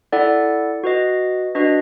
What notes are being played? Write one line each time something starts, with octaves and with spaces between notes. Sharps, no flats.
E4 A4 D5 F#5
F#4 B4 D#5
D4 F#4 B4 D#5